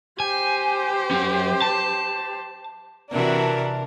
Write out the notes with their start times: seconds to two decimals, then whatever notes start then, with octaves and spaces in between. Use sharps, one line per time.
0.20 G4 C5 G#5
1.11 F#3 C#4
1.62 A5
3.11 C3 E3 D4 F#4 A#4